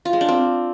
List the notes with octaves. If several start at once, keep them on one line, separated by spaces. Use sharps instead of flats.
F4
G#3
D4
C4